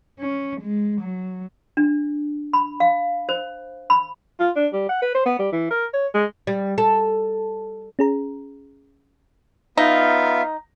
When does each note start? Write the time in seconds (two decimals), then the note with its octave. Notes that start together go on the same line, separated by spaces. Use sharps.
0.19 C#4
0.61 G#3
1.01 F#3
1.77 D4
2.53 B5
2.80 F5
3.29 C5
3.90 B5
4.40 F4
4.56 D4
4.73 G3
4.89 F#5
5.02 B4
5.15 C5
5.26 B3
5.39 G3
5.52 E3
5.71 A#4
5.94 C#5
6.15 G#3
6.47 G3
6.78 A4
7.99 C#4 G#4 A#5
9.77 B3 D#4 F4 E5 F5